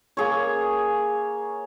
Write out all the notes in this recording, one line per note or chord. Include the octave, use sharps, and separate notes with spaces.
A#3 G#4 C#5